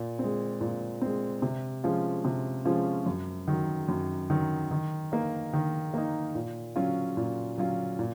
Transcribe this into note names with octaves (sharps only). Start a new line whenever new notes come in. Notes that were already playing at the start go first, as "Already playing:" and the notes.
Already playing: A#2
G#3 C4
A#2
G#3 C4
C3
F3 G#3 C#4 F4
C3
F3 G#3 C#4 F4
F#2
D#3 F#3
F#2
D#3 F#3
D#3
A#3 D#4
D#3
A#3 D#4
A#2
F#3 C#4 F4
A#2
F#3 C#4 F4
A#2